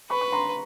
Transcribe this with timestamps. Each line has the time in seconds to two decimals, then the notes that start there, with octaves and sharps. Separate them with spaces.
0.10 B4 B5 C#6
0.21 C#6
0.32 A#5 C6